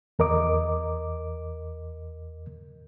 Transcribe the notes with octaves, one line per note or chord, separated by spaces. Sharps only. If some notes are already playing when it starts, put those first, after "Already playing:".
E2 A#4 D#5 D6